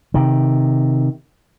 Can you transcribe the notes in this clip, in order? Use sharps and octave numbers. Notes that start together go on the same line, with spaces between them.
C3 D#3